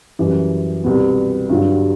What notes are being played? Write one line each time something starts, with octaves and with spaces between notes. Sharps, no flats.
F#2 E3 G3
C2 B2 G3 B3
G2 D3 F#3